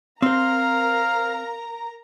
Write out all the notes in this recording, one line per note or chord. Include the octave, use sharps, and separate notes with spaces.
C4 A#4 C5 F5 A#5